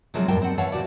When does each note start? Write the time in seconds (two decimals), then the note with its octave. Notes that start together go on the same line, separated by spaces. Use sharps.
0.14 C3 F3 F#3 G#3 C4
0.28 F2 A2 G3 A#4 G5 A5
0.42 C4 F#5
0.58 E3 C#5 F5 F#5 A5
0.72 A2 C3 F#4 D5